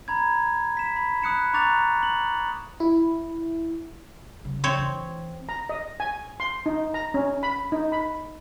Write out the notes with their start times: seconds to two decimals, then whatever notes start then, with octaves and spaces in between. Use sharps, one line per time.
0.08 A#5 B5 G#6
0.77 B6 E7
0.96 B5
1.22 B5 D#6 F#6 C#7 E7
1.53 A#5 C#6 D6 F#6 A6 F7
2.03 F#7
2.80 E4
4.45 C#3 F#3
4.64 C4 C#5
4.79 E3
5.49 A#5
5.69 D#5
6.00 G#5
6.40 C6
6.66 D#4
6.94 A#5
7.14 C#4
7.43 B5
7.72 D#4
7.92 B5